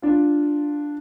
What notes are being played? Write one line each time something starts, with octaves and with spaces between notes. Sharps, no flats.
D4 F4